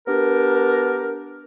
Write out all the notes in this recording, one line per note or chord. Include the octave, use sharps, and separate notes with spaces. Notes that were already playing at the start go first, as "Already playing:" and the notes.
B3 D4 G4 A#4